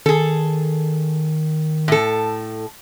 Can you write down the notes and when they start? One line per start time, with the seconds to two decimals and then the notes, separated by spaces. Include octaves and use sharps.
0.06 D#3 G#4 A4
1.88 A2 A4